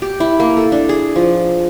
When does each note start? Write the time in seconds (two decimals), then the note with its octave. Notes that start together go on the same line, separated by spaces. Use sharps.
0.02 G4
0.20 E4
0.40 A#3
0.57 A4
0.72 D4
0.89 G#4
1.16 F3